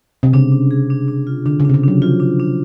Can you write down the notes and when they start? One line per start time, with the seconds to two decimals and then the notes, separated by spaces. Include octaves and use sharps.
0.23 C3
0.33 C#3 D4
0.52 D4
0.71 G#4
0.90 D4
1.08 D4
1.27 F4
1.46 D3 D4
1.60 C#3
1.65 C3 D4
1.74 C#3
1.84 F#3 D4
2.02 F3 F4
2.20 D4
2.40 D4